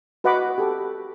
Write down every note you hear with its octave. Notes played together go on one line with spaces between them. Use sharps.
F#4 B4 D#5 F#5 B5 D6
G4 A4